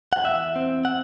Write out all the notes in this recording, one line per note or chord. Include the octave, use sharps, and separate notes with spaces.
F#5
E2 E5
C4
F#5